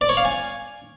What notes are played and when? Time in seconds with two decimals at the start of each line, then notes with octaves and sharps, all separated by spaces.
0.01 D5
0.09 C#5
0.17 F5
0.25 G#5